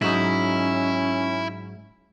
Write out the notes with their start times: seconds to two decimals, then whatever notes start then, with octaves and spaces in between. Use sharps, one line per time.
0.02 G#2 F#3 C#4 D#4 E4